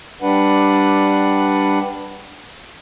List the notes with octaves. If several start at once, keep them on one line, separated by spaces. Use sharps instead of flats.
G3 D4 B4 F#5